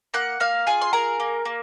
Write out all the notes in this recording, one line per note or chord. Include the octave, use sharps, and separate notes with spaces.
A#3 F#5 F#6
A#3 F5 F6
F4 G#4 G#5
C6
G#4 A#4 A#5
A#3
A#3